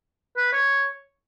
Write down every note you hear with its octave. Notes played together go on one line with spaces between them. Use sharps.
B4
C#5